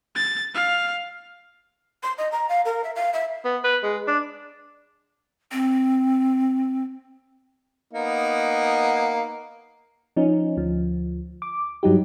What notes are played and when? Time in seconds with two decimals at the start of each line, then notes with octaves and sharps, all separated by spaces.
0.16 A6
0.54 F5
2.03 C6
2.18 D#5
2.32 A#5
2.49 F5
2.65 A#4
2.84 E5
2.96 F5
3.13 E5
3.45 B3
3.64 B4
3.83 G#3
4.07 D4
5.52 C4
7.93 A#3 B3 D#4
10.16 F3 C#4 D#4
10.57 D2 F3
11.42 D6
11.83 G2 F#3 D#4 G4